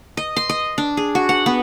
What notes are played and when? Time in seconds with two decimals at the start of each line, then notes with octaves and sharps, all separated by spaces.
0.17 D#5
0.36 C6
0.49 D#5
0.78 D4
0.97 G#4
1.15 F#4
1.29 F#5
1.46 B3